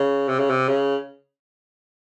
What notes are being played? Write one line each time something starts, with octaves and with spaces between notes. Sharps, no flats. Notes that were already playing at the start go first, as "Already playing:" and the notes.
Already playing: C#3
C3
C#3
C3
C#3